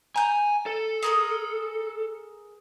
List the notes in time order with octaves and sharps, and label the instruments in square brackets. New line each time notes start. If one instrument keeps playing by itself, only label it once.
[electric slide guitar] G#5 [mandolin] A#5 G6
[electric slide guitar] A4
[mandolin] G#4 A#4 D#6